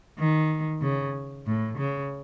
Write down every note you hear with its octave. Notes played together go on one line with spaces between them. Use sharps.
D#3
C#3
A2
C#3